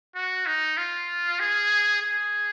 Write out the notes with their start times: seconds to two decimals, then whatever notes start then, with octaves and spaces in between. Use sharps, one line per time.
0.16 F#4
0.46 D#4
0.77 F4
1.40 G#4
2.02 G#4